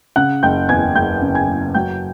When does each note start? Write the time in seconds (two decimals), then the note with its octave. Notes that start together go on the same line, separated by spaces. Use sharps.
0.16 C#3 F#5 F#6
0.43 F#1 G5 G6
0.69 E2 G#5 G#6
0.95 F#1 G5 G6
1.22 C#3
1.35 G#5 G#6
1.48 F#1
1.74 F#3 G5 G6